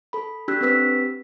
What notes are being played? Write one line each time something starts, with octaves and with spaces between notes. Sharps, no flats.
A4 B5
D4 G4 A4 E6 F#6 B6
C4 G4 B4 E6 B6